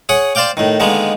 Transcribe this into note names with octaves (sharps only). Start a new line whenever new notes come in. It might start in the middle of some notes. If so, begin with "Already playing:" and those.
G#4 C#5 F#5 D#6
C5 D5 F5 G5 D6
A2 D#3
D3 D#3 G#3 A#3 B3